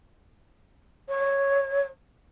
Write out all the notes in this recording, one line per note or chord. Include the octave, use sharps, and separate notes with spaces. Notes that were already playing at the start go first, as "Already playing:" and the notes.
C#5